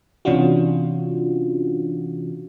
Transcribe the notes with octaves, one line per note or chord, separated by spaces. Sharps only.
C3 E3 C#4 D4 F4 F#4